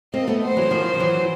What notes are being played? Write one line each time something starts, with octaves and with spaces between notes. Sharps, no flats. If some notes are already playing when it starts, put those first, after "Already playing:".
A#3 C4 D#5
A3 B3
C5
E3 F#3
D#3 F3
F3
E3 F#3